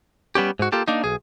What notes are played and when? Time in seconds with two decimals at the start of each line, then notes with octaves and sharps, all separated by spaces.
0.35 G3 B3 C#4 G4
0.59 G#2 F#4
0.72 A#3 F4 G4 A4
0.88 A#3 D4 D#4
1.04 B1 G#4